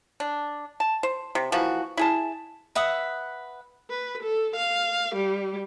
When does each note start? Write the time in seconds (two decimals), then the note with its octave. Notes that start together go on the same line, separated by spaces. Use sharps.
0.20 D4
0.80 A5
1.03 C5
1.35 C3
1.52 E3 F3 A#3 F#4
1.97 E4 G#4 A5
2.75 B4 E5 F#5 D#6
3.90 B4
4.23 A4
4.56 F5
5.15 G3